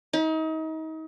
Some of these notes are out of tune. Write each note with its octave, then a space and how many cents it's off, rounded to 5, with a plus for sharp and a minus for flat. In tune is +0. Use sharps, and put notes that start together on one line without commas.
D#4 +35